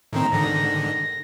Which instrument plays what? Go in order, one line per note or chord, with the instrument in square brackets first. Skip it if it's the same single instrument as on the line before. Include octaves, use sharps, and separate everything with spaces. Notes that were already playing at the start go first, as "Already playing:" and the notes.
[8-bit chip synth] A2 D#3 C4 [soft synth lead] A#5
[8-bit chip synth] G#2 D3 D#3 [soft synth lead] A#6